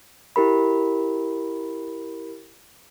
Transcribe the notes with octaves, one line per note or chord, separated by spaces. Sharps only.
E4 G4 A#4 B5